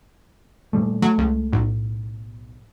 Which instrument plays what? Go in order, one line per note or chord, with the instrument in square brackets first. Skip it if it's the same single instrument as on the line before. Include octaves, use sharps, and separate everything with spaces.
[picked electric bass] A#2 G3 A3
[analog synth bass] F#3 [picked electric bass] A3
[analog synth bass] C#2
[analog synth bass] B1 [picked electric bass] A2